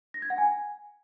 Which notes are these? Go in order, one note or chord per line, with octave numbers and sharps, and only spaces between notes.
A#6
G#6
F#5
G#5